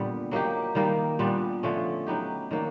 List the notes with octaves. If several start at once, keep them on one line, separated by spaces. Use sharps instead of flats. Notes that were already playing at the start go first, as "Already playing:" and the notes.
Already playing: A#2 D3 G3 B3
F#3 A#3 D#4 G4
D#3 G3 A#3 D#4
A#2 G3 B3 D4
D3 F3 A3 C#4
F#3 B3 D#4 G4
D#3 F#3 A#3 D4